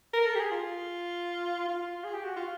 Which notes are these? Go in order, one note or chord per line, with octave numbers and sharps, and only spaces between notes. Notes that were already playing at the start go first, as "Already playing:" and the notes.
A#4
A4
G4
G#4
F4
F4
G#4
G4
F#4
F4